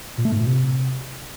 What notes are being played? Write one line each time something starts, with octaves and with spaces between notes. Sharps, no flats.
A#2
A3
G#2
A#2
C3